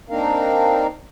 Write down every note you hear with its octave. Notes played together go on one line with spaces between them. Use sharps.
A#3 C4 D4 D#4 A#4 F5